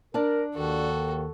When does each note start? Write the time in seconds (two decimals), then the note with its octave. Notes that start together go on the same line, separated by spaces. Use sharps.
0.14 D4 A#4 D5 A5
0.55 D#2 D#3 F#4 A4